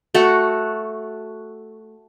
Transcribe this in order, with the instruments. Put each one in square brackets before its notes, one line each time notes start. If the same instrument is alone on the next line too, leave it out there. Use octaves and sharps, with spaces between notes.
[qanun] A3 F#4